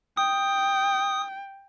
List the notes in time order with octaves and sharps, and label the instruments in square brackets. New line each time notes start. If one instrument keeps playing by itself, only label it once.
[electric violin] G5 [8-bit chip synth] D#6